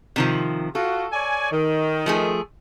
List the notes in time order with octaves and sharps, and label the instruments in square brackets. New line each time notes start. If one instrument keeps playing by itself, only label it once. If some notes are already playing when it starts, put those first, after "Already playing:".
[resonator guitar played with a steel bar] C3 D#3 F3
[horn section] F4 F#4 [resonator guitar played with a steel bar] A4
[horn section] C#5 D5 G#5
D#3
[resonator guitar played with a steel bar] F3 A3 G#4